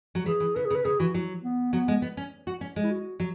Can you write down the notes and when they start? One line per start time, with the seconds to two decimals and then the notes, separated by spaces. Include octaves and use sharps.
0.15 F#3
0.26 E3 G#4
0.40 E3
0.56 C#3 B4
0.65 G#4
0.70 C#3
0.75 B4
0.85 C#3 G#4
0.99 E3 F#4
1.14 F#3
1.44 B3
1.73 F#3 B3
1.88 G#3
2.02 B3
2.17 C#4
2.47 F#4
2.61 C#4
2.76 G#3
2.84 E4
2.91 F#4
3.20 F#3